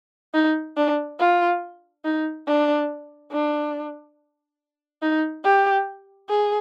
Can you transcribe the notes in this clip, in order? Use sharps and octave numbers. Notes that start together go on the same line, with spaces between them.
D#4
D4
F4
D#4
D4
D4
D#4
G4
G#4